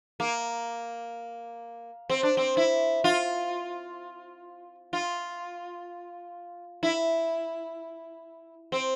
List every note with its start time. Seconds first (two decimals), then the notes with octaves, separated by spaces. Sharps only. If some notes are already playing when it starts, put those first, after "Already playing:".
0.20 A#3
2.10 C4
2.23 D4
2.37 C4
2.57 E4
3.04 F4
4.93 F4
6.83 E4
8.72 C4